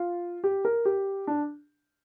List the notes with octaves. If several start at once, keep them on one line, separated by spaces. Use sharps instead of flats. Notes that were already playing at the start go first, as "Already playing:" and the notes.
Already playing: F4
G4
A#4
G4
D4